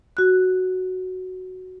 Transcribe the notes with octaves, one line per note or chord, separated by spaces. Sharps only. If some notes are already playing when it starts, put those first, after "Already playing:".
F#4 F#6